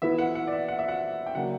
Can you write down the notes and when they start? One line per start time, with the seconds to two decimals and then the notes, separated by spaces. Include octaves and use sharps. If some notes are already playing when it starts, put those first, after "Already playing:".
0.02 E3 B3 E4 E5
0.18 F#5
0.35 F#5
0.47 D5
0.52 E5
0.68 F#5
0.79 E5
0.88 F#5
1.26 G5
1.35 C#3 F#3 A#3 D4 F#5